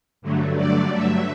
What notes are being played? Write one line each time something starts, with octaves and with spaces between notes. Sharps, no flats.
G2 D3 F#3 A3
D5
E5